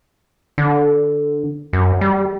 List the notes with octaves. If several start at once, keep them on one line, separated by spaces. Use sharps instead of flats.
D3
F#2
G3